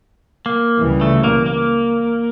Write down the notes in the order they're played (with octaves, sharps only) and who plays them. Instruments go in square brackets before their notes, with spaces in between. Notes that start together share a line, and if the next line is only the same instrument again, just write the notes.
[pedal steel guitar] A#3
[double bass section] C#2 C#3 E3 G3
[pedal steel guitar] A3
A#3
A#3